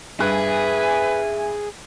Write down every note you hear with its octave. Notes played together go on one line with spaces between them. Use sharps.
G2 G#4 B4 E5 G#5 B5 F#6